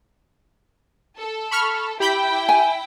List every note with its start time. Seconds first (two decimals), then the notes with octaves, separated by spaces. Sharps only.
1.18 A4
1.51 B5 C#6 F6
2.00 E4 G4 G5 B5 G6
2.49 G#5